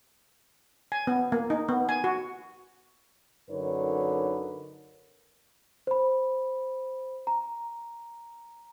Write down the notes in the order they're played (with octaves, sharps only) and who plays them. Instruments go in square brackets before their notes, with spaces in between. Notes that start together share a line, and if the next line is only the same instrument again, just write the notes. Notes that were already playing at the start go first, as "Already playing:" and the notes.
[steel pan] G#5
B3
A#3
D#4
B3
G#5
F#4
[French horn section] F#2 D3 D#4 A#4 B4 C#5
[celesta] C5 B5
A#5